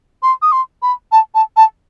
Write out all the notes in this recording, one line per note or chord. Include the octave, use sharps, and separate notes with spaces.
C6
D#6
C6
B5
A5
A5
A5